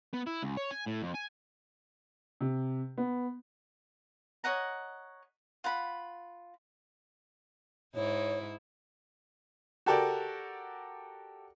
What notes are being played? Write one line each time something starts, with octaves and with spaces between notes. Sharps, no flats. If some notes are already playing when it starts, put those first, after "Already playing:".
B3
E4
C#2
C#5
G#5
A2
F2
G#5
C3
B3
C#5 D#5 F#5 A#5
F4 F#5 B5
G#2 E4 C#5
F#4 G4 A4 A#4 D5 G5